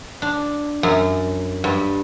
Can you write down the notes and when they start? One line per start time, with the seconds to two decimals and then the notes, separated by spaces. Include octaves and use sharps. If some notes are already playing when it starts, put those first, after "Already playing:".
0.22 D4
0.83 F#2
1.64 G2